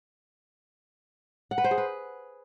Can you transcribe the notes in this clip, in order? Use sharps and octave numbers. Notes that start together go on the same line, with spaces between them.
F#5
B4
C5
G#4
B4